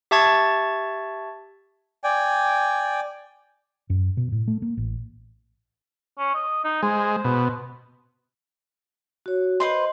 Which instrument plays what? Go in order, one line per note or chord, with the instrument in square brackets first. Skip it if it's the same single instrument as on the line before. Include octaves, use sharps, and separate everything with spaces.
[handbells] G4 E5 A5 C#6 G#6 A6
[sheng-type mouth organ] D5 G5 G#5
[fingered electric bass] F#2
B2
A2
A3
A#3
A1
[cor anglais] C#4
D#5
D#4
[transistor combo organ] G#3 [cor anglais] C5
[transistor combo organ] B2
[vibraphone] F#4 C#5
[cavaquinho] B4 C5 C6 [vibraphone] D#5